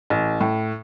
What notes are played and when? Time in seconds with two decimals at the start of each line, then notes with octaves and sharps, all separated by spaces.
0.10 A1
0.41 A2